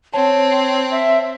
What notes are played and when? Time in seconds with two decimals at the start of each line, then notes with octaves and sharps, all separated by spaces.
0.14 C4 C#5 A5
0.91 E5